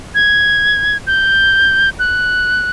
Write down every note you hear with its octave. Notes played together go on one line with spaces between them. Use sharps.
G#6
G6
F#6